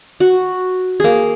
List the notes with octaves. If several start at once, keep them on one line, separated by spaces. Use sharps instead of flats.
F#4
A#3 G#4